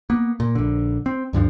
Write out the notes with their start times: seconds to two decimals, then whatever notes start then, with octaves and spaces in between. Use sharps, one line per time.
0.10 A#3 B3
0.40 A#2
0.55 A#1 D3
1.06 C4
1.33 D2 G2 D3 F3